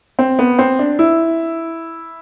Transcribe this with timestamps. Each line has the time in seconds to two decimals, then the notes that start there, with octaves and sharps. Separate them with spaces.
0.19 C4
0.39 B3
0.59 C4
0.79 D4
0.99 E4